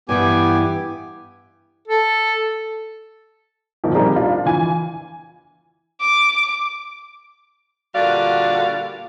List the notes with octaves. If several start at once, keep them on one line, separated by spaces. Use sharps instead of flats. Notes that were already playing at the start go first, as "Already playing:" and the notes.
G2 E3 B3 G4 G#5
A4
G1 D#2 A#2 F3
G3 A#3 C4 D#4
D4 F4
E3 G#5
D6
A#2 D3 G3 F#4 D5 F5